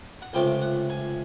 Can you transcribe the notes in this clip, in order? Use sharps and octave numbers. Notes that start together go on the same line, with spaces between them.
F#5
C#2 C3 F3 A3 G5
F#5
G#5